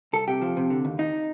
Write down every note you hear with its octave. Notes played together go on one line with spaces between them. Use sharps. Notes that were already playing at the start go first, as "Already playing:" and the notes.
C2 A4
C3 G4
F3
C3
D3
D#2
D#2 D#4